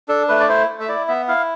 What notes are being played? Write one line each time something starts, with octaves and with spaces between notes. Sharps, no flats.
D4 A4
A3 B4
D5
E4 C5
A3
E5
E4 D5
B3 E5
E4 F5